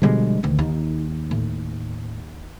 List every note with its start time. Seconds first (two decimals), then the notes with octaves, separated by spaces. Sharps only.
0.02 B2 D3 F3 G3 G#3
0.43 D2 D#3
0.59 D#2 D#4
1.31 A2